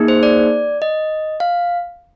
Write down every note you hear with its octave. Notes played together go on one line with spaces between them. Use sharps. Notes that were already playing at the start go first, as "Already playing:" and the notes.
Already playing: A#3 D#4 G#4
C5
D5
D#5
F5